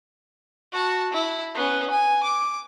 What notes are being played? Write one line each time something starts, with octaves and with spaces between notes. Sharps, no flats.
F#4 A5
E4
B3 C#4
G#5
D6